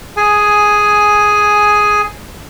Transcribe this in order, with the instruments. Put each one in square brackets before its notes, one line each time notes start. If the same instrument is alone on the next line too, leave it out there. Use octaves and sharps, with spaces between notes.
[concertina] G#4 G#5